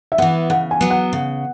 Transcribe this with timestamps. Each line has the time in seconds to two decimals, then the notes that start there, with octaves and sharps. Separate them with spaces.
0.12 E5
0.18 E3 B3 F#5
0.50 C#3 F#5
0.71 G#5
0.81 F#3 B3
0.91 F#5
1.13 C#3